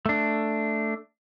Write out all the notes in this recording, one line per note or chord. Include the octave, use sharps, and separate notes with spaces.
A3 D4